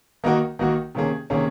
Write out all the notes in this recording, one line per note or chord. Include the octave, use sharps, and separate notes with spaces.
D#3 A#3 D#4 F#4 A#4
D#3 A#3 D#4 F#4 A#4
C3 D#3 A#3 C#4 G#4
C3 D#3 A#3 C#4 G#4